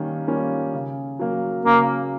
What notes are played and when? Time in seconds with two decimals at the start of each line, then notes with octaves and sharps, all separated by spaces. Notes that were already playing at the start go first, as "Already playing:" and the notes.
Already playing: D#3 G3 A#3 C#4
0.28 G3 A#3 C#4 F4
0.73 C#3
1.19 F#3 A#3
1.65 C#3 A#3